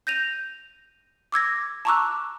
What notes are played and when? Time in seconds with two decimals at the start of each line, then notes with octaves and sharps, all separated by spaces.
0.07 G6 A#6 D#7 F7
1.32 D6 E6 G#6 A#6
1.85 A5 A#5 C#6 D6 E6 F#6